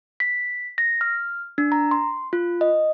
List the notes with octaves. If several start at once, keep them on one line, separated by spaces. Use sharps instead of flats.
B6
A#6
F6
D4
A#5
C6
F4
D#5